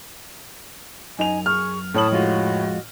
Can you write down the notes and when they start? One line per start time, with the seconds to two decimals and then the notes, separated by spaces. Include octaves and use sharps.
1.19 F#2 D#4 G#5 F7
1.46 G#4 C#6 F6
1.94 A2 C#5 A5 B5 D#6 F#7
2.11 F2 G#3 F4 F#4 D#5